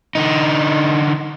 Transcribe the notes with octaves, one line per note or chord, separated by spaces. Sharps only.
D3 D#4